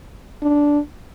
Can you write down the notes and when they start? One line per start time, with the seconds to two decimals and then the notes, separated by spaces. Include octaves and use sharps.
0.42 D4